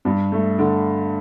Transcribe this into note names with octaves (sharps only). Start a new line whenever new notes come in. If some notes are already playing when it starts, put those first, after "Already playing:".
G2
A3
D3